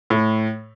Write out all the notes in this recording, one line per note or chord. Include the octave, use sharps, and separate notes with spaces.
A2